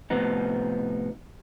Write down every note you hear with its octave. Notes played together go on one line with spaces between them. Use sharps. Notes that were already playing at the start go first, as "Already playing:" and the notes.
A2 C3 F3 B3 D#4